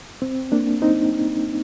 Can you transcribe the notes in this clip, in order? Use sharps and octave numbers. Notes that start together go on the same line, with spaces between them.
C4
A#3 D4
C4 D#4